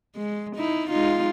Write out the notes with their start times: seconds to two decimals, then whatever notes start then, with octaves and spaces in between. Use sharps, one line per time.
0.16 G#3
0.56 D#4 E4
0.90 G#3 D#4 F4